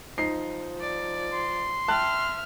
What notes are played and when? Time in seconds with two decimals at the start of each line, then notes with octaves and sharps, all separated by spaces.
0.18 F3 D#4 C7
0.80 D5
1.32 C6
1.88 E5 G5 A5 F6 F#6